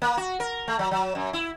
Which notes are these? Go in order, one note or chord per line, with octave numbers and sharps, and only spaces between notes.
A#3
F#4
A#4
A3
F#3
F#3
F#2
E4